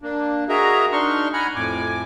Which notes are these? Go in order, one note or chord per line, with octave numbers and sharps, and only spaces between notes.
A#3 D4
F#4 G#4 A#4 D#5 E5 A#5
D4 D#4 C6 C#6 F6
F#5 G#5 A#5 B5 F6
F2 A2 G#5 D6